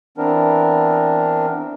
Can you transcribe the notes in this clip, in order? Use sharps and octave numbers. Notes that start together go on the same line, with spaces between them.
E3 B3 C4 D4 A#4